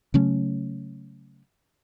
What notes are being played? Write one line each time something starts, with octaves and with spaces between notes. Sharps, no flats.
C#3 F#3 A3 C#4